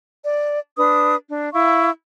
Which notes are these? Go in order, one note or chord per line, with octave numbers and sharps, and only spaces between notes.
D5
D4 B4 D#6
D4
E4 F5 C#6